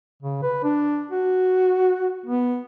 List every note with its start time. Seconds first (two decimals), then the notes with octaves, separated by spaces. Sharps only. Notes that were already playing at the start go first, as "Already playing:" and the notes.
0.23 C#3
0.43 B4
0.64 D4
1.11 F#4
2.26 B3